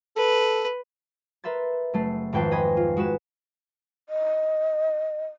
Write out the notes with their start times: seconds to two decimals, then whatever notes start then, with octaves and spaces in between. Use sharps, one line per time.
0.17 A4 B4
1.44 A#4 B4 E5 C6 A6
1.93 F#1 A3 C7
2.33 G#1 F2 B4 G5 A5 C7
2.51 B4 D#5 G#5 B5 C6
2.77 F4
2.97 G#3 F#4 B4 E7
4.09 D#5